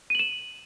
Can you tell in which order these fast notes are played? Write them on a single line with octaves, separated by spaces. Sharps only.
D#7 F#7 E7